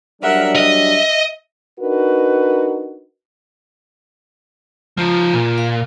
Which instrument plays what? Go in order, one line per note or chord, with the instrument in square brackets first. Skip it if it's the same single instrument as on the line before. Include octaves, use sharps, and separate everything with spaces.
[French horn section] F#3 G3 D4 [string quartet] A#4 E5 F#5
[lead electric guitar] D#5 [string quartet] E5
[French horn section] D4 D#4 F#4 A#4 B4
[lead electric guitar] C#2 F3 [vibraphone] F4 A#5
[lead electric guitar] A#2
[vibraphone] F5